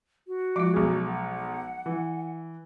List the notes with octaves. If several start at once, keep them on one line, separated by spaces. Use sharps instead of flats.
F#4
F3 G#3 F4 D6
B1 G#4
F#5
E3